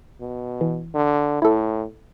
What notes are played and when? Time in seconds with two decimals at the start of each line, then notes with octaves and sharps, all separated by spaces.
0.21 B2
0.61 E3
0.95 D3
1.42 A2 E4 A4